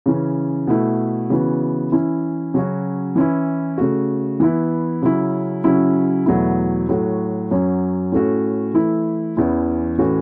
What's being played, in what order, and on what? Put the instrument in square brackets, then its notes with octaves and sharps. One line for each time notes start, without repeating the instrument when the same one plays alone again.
[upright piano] C#3 E3 C#4
B2 A3 E4
C#3 E3 B3 F#4
E3 C#4 E4
C#3 F#3 C#4 F#4
E3 C#4 E4
C#3 A3 F#4
E3 B3 E4
C#3 F#3 C#4 E4
C#3 F#3 C#4 E4
E2 B2 F#3 A3 E4
A2 F#3 A3 F#4
F#2 F#3 C#4
A2 A3 C#4 F#4
E3 A3 E4
E2 E3 C#4 E4
A2 E3 C#4 F#4